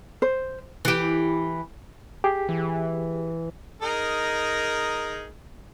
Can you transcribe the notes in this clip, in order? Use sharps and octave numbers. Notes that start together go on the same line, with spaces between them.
C5
E3 G4
G4 G#4
E3
D#4 G#4 A#4